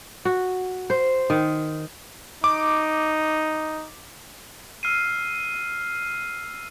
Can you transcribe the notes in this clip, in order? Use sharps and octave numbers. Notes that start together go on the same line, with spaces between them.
F#4
C5
D#3
D#4 D6
E6 F6 C7 D#7